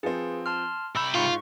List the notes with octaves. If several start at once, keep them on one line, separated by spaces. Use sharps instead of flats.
F3 C4 G#4 B4
A5 C6 F6
C3 A#5 B5 E6 G6 E7
G#2 F4 C#6